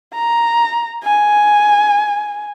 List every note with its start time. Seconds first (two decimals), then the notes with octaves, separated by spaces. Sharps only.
0.13 A#5
1.04 G#5